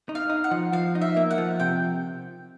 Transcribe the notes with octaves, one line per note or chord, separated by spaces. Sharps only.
D#4
F5
D#4
F#5
F3
F3 F5
D#4
E5
A#3
F#5
F3
C3 G5